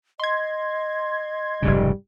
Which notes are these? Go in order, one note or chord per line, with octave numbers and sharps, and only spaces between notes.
D#5 C6 G#6
F1 G#2 C#3 G3